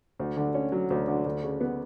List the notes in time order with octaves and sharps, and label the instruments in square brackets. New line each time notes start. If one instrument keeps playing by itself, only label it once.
[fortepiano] D2
D3
C#4
F#3
D2
D3
D2
C#3
B3